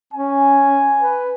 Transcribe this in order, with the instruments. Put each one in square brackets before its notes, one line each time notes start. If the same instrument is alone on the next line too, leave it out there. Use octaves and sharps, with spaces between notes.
[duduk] C#4 [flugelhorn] G#5
[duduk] B4